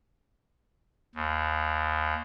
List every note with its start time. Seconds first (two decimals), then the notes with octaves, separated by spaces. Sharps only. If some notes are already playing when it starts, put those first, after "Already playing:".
1.15 D#2